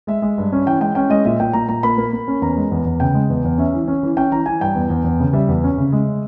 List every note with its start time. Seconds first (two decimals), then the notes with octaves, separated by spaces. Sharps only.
0.07 G#3 E5
0.22 G#3
0.38 G2
0.52 C#4
0.66 E3 G5
0.80 G#3 G5
0.95 C#4 G5
1.10 G#3 D#5
1.25 A#2 E5
1.40 A#2 G5
1.53 A#2 A#5
1.69 A#2 A#5
1.83 A#3 B5
1.98 A#3
2.13 A#3
2.28 C#4
2.42 E2 A#5
2.57 G#3
2.72 E2
2.85 E2
3.00 C#3 G5
3.14 G#3
3.30 E2
3.44 E2
3.58 C#4 E5
3.74 E3
3.88 C#4
4.03 E3
4.17 C#4 G5
4.32 E3 A#5
4.46 E3 G#5
4.60 G2 G5
4.75 E2
4.90 E2
5.04 E2
5.20 C#3
5.33 G3 E5
5.48 E2
5.64 C#4
5.78 C#3
5.92 G#3